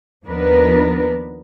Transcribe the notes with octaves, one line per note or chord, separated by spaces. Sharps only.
D#2 F3 B3 D4 A#4 B4